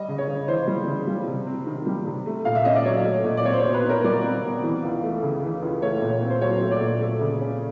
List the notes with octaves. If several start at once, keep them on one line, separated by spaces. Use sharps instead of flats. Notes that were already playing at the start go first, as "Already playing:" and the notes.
Already playing: G3 D#5
C#3
C#5
C#3
E3 C5
G3
C#3
G3
C3
C4
D#3
G3
C3
A3
A#2 F5
E5
C#4 D#5
D5
F#3 C#5
A3
A#2
D5
C4 C#5
C5
C#5
B2
B4
D#4
A#4
G3 D5
C4
B2
E3
C#2
A3
C#3
E3
C#2
A3 C#5
A#2
C4
C5
F#3 C#5
A3
D5
A#2
A3
C#3
C#4